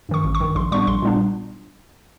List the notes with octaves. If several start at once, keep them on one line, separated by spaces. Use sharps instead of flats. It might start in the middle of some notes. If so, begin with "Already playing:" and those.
G2 D#3 C#6
A1
C#6
G2 D#3
A#1 C6
A#2 G3 B3 D4 C#6
A#1 C6
A#2 G3 B3 D4